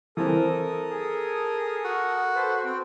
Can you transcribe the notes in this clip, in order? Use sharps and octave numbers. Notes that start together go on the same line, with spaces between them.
E3 C4 A4 A#4 D#6
G#4
F#4
A4 B4 C5
C4 G5